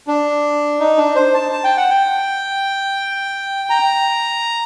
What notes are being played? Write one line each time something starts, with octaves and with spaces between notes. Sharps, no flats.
D4
D#4
D4
C5
A5
A5
G5
F#5
G5
A#5